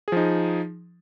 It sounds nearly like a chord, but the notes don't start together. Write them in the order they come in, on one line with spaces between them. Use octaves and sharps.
G#4 F3 D#4